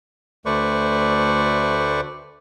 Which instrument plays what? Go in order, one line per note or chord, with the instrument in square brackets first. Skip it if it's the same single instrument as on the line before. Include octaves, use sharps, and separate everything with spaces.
[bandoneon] D2 A3 B4 C5 D5 C#6